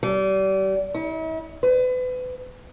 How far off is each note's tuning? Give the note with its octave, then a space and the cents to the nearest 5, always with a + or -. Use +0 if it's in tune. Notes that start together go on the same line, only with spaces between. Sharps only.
G3 -35
E4 -45
B4 +35